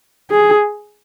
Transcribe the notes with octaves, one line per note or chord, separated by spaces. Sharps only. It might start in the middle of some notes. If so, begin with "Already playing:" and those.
G#4